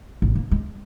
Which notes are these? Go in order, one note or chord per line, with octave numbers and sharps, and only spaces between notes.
A1
A#3
G#3